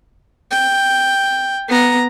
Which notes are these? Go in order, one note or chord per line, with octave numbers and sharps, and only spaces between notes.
G5
B3 A#5